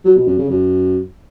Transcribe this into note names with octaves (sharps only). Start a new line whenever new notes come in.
F#3
B2
F#2
C#3
F#2